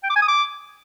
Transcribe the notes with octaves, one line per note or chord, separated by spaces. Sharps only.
G5
D6
G#5
D#6
D6